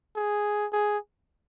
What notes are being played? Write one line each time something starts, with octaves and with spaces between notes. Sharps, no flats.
G#4
G#4